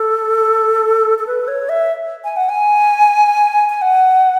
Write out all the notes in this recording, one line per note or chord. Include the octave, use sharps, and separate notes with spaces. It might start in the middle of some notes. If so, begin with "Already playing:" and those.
Already playing: A4
A4
B4
C#5
E5
G#5
F#5
G#5
G#5
F#5